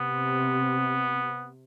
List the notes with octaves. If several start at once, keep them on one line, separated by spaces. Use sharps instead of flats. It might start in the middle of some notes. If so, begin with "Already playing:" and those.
Already playing: C3 B3